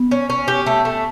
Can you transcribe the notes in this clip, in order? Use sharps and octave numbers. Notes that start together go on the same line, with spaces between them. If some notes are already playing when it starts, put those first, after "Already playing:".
Already playing: B3
C#4
C#4
G4
A3
A3